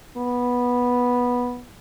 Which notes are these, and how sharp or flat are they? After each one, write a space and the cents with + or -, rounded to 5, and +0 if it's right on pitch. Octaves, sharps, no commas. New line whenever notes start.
B3 -10